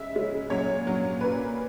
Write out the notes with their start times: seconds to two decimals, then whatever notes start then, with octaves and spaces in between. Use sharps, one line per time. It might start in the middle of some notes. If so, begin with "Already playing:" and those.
Already playing: C#3 G#3 C#4 E5
0.15 C#3 G#3 C#4
0.50 A#2 F#3 C#4 C#5
0.85 A#2 F#3 C#4
1.21 A#2 A#3 C#4 B4